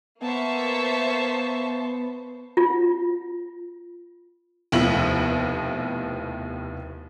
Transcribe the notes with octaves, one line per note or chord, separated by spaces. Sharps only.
A#3 B3 C5 E5 A5 C#6
F4
F1 D#2 B2 F3 E4 F#7